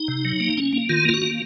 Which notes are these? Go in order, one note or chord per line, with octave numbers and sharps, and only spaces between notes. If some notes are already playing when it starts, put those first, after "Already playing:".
Already playing: D#4
C3
F#3
A#3
C#4
A#3
D#3 F4
A#3 F4
F#4
A#3